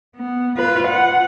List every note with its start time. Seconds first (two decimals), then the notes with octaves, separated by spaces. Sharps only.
0.16 B3
0.57 F4 B4
0.88 F#5